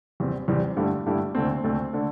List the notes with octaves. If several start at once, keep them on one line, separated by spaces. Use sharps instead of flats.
E2 E3 G3 C4
E2 E3 G3 C4
G2 D3 A3 E4 G4
G2 D3 A3 E4 G4
D2 D3 A3 C4
D2 D3 A3 C4
D3 A3